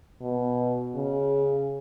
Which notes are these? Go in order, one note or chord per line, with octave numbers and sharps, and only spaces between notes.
B2
C#3